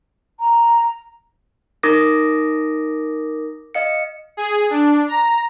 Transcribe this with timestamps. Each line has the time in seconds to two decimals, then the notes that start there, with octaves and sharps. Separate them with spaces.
0.40 A#5
1.83 D#4 A#4 D6 D#6 A#6
3.75 D#5 F5 C#7
4.37 G#4
4.70 D4
5.08 A#5